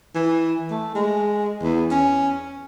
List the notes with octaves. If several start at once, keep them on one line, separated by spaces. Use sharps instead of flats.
E3
A3
G#3
E2
C#4